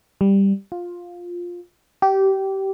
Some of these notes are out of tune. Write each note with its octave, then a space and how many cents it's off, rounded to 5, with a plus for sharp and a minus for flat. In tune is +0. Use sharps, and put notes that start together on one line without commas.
G3 +5
F4 +10
G4 -20